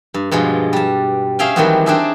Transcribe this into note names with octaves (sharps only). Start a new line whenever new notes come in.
G2
G2 B2 F3 G#3
G3 A5
C#4 G#4 E5 F5 G5 G#5
D#3 E3 F#3 G3 B3 C4
C4 D4 D#4 G#4 E5 G#5